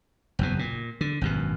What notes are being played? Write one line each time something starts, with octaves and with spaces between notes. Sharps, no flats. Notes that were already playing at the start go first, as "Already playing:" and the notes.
F#1 E2 B2
A#2
D3
G#1 F#2 B2